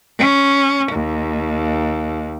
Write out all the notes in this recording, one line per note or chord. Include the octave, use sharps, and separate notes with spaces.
C#4
D#2